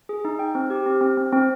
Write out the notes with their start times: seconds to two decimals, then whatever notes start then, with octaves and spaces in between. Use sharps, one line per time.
0.09 G#4
0.25 D#4
0.39 G5
0.55 C4
0.70 G4
0.86 C4
1.01 C4
1.18 C4
1.33 C4